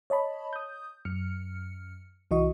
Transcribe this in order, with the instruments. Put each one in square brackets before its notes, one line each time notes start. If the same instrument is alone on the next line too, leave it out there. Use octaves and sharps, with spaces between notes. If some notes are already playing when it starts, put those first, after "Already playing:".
[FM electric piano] C#5 D#5 A5 B5
D#6 G6
F#2 F6 C#7
C2 E3 F#4 D#5 C#6